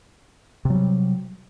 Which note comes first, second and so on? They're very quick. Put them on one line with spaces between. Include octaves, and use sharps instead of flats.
C3 F#3 G3